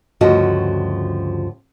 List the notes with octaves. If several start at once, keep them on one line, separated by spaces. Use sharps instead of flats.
D2 G2 C#3 F3 F#4 D#5